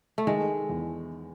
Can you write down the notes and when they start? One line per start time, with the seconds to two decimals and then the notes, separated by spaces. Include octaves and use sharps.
0.18 A3
0.27 D#3 G#3
0.69 E2